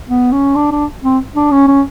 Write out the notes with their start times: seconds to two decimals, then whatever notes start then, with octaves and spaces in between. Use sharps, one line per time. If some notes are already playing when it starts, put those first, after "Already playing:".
0.08 B3
0.32 C#4
0.56 D4
0.72 D4
1.04 C4
1.35 D4
1.51 C#4
1.67 C#4